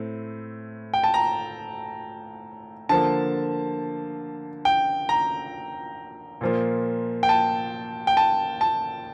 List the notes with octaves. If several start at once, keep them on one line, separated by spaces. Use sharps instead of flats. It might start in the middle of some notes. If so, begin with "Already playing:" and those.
Already playing: A2 A3 C4
G5
A5
A#5
D3 F3 A#3 A5
G5
A#5
A#2 F3 A#3
G5
A5
G5
A5
A5